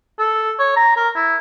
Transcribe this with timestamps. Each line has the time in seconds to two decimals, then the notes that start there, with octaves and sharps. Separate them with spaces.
0.19 A4
0.59 C#5
0.76 A#5
0.97 A#4
1.15 E4